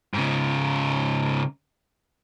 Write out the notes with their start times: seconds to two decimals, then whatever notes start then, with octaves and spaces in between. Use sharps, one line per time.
0.14 G#2 C#3